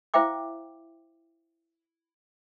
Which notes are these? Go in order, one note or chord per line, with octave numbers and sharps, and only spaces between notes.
E4 C5 E5 F5 G5 D6